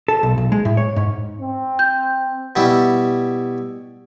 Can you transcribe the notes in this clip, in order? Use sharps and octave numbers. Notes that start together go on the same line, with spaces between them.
A4
B1
B1
G#3
A2
C#5
G#2
C4
G6
B2 G3 E4